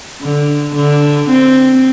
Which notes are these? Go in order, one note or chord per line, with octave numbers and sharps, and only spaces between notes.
D3
D3
C4